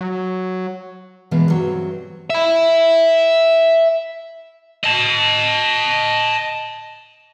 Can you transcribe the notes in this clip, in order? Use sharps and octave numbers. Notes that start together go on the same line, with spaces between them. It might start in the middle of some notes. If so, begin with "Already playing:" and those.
F#3
B2 E3 G#3 A#3 B3
G2 F#3 C4
E5 B5
D#5 A5